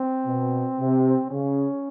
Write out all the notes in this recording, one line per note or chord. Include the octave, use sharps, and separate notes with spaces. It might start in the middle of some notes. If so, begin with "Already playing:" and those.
Already playing: C4
B2
C3
C#3 C#4